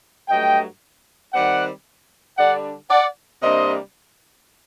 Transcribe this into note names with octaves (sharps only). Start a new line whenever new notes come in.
G2 F#3 A3 D#5 G5
D#3 G3 C4 D5 F#5
D3 G3 D4 D5 F#5
D5 F#5
C3 G3 A#3 D4 C5 D#5